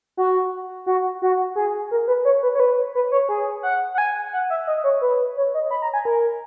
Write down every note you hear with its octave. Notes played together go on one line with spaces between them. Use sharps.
F#4
F#4
F#4
G#4
A#4
B4
C#5
B4
C#5
B4
B4
C#5
G#4
F#5
F#5
G#5
F#5
E5
D#5
C#5
B4
C#5
D#5
B5
A#5
G#5
A#4